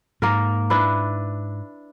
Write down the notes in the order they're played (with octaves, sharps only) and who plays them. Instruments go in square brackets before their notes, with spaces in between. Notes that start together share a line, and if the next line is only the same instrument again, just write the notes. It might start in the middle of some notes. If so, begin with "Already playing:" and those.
[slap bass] G#2 [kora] A#3 A#4
[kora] D4 E4 B4